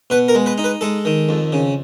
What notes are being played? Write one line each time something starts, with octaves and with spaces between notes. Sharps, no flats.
B2 B4
A#4
G#3
B4
D#4
B4
G#3 A4
D#3
F2
C#3